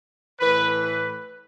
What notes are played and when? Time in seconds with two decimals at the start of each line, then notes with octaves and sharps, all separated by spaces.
0.40 A2 E3 A3 B4
0.82 B4